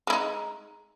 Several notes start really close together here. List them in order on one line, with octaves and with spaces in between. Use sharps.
G#3 E4 D#4